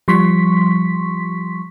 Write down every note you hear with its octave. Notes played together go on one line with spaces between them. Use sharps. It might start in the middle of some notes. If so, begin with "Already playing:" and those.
F3 G3 C6 C#6 B6